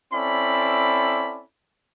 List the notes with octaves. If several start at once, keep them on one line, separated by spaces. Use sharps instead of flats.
C4 C#4 E4 A4 D5 B5